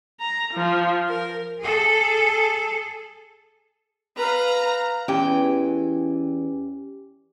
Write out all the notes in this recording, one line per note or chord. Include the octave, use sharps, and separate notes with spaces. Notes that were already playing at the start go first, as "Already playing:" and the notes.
A#5
F3
A#4
G#4 A4
B4 F5 A#5
E2 E3 C#4 G4 G5